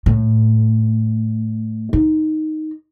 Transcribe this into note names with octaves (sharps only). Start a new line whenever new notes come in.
A2
D#4